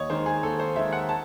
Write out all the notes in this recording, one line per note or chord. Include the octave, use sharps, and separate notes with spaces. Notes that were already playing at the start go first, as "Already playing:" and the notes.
Already playing: D#2 C#5 D#5
D#3 G#3 D#4 C5
G#4
D#2 A4
C5
D#3 G#3 D#4 E5
F#5
A5